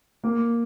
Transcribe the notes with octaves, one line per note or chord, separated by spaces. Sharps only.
A#3